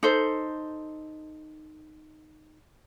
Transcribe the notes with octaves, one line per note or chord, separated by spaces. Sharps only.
D#4 A4 C5